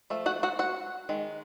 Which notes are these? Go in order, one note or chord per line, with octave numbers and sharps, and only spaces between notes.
F3 A3
F#4 F#5
F#4 F#5
F#4 F#5
D#3 G#3